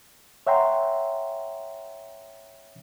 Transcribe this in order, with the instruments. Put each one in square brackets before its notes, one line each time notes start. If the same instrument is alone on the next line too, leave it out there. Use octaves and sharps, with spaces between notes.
[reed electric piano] C#5 E5 F#5 G5 A#5 C6